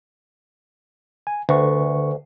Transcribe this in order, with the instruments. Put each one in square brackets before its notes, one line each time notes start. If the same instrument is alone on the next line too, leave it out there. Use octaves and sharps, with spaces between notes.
[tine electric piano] G#5
[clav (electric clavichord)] D2 [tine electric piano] D3 B4 C#6